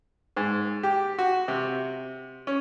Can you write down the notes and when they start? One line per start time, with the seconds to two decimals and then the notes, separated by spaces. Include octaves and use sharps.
0.37 G#2
0.83 G4
1.19 F#4
1.48 C3
2.47 C#4